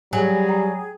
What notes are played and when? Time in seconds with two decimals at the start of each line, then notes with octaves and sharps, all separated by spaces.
0.13 F#3 G3 G#4 G#5
0.49 G5 A#5